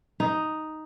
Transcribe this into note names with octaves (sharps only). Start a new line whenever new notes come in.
D#4